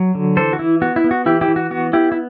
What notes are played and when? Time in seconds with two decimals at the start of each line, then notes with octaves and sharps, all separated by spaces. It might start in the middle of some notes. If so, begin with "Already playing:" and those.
Already playing: F#3
0.15 D3
0.37 E3 A4 C5
0.53 F#4
0.59 E3 E4
0.82 B3 F#4
0.96 E4
1.04 B3
1.11 F#4
1.26 E3 E4 G4
1.41 E4 G4
1.48 E3
1.56 F#4
1.71 B3 F#4
1.93 B3 E4 G4
2.12 E4